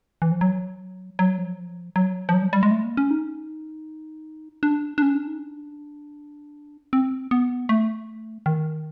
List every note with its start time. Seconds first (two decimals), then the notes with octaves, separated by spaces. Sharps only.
0.22 E3
0.32 F3
0.41 F#3
1.19 F#3
1.38 F3
1.96 F#3
2.29 F3
2.34 F#3
2.42 G3
2.53 G3
2.63 G#3
2.71 A3
2.85 A#3
2.97 C#4
3.11 D#4
4.63 D4
4.98 D4
5.02 C#4
5.15 D4
5.27 D#4
5.39 D4
6.93 C4
7.31 B3
7.69 A3
8.46 D#3